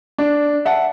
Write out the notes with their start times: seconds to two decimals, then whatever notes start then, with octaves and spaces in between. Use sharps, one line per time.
0.18 D4
0.65 E5 F#5 A5